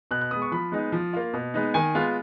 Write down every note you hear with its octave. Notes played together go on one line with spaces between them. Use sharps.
B2 F#6
F#6
G#3 B3 D#6
C#6
F3 B5
G#3 B3 D#4
F3
A#3 F4
B2
G#3 B3 D#4
D#3 G#5
G#3 B3 F4